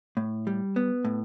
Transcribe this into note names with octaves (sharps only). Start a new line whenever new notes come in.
A2
G3
B3
A2